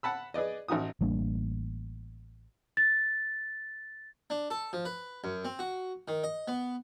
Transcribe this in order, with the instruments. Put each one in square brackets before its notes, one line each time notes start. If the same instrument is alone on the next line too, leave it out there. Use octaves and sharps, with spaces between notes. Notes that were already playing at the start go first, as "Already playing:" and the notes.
[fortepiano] F#5 A5 B5 E6
G#4 B4 D5 D#5
A1 D#4 F#4 D#6
[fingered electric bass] A1 G3 A#3 D4
[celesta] A6
[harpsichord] D4
A4
F3
B4
F#2
C4
F#4
D#3
D#5
B3